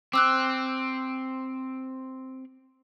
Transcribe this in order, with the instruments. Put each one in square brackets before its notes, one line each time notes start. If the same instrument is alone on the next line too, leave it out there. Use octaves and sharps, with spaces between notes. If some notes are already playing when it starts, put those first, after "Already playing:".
[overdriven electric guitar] C4 [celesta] D6 E6 F#6